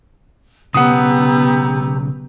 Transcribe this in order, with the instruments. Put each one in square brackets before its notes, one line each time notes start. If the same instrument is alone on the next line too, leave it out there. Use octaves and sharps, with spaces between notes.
[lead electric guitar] B1 C#3 [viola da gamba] B3 [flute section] G4 A#5 E6 [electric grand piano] F#5 D#6